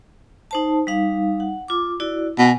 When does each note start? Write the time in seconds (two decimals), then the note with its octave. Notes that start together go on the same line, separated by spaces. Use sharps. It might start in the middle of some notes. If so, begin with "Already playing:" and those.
0.51 D#4 C5 A5
0.87 G3 D#4 F5
1.40 F#5
1.68 F4 D6
2.00 E4 F#4 D5
2.39 B2 G#5